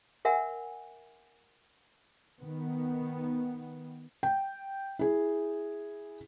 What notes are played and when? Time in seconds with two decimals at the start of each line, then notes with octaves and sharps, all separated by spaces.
0.25 A#4 E5 F#5 G#5
2.40 D#3 B3
4.23 G5
4.99 E4 G#4